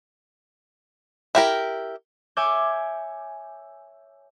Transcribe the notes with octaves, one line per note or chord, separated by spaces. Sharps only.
E4 G4 A#4
C#5 E5 G#5 D6 G6